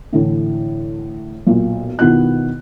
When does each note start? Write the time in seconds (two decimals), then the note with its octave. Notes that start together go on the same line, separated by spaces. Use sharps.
0.13 A2 D3 E3
1.47 B1 A#2
1.99 B2 D#3 B3 E4 F4 F#6